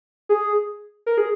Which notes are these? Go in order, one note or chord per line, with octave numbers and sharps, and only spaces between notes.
G#4
A#4
G#4